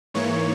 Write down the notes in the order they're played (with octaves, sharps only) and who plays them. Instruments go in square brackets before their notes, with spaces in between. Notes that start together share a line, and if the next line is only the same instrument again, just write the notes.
[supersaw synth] G#2 E3 A#3 C#5